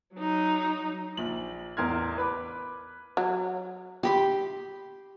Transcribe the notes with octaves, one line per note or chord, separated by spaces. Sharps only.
F#3 D#4
A#1 F#7
A1 E2 A#4 C6 F6 G#6
B4 B5 D6
F#3
G4 B5 C6